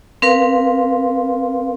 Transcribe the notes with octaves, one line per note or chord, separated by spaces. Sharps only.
C4 A#4 B4 F5 C6